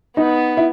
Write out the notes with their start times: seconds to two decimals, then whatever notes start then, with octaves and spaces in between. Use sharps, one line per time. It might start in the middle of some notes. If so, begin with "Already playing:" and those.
0.17 B3 D#4
0.57 E4